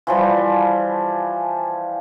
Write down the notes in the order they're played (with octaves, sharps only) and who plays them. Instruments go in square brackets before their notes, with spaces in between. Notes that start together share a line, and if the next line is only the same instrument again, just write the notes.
[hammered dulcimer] E3 F3 G3